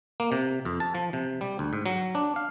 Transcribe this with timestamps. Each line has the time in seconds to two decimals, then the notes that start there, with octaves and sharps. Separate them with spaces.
0.20 A#3
0.32 C3
0.65 F2
0.80 A5
0.95 F3
1.13 C3
1.41 G3
1.59 D2
1.73 G#2
1.86 F#3
2.15 D4
2.36 F5